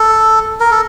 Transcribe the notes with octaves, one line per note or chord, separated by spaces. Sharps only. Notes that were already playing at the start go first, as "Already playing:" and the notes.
Already playing: A4
A#4
A4